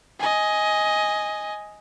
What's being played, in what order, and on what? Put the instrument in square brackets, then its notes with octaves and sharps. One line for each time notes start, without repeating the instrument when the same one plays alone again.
[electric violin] D#5 G#5